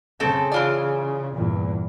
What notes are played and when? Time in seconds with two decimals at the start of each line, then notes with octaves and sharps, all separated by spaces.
0.20 C#3 A3 C4 A4
0.52 E3 F4 D5
1.36 E2 G2 A#2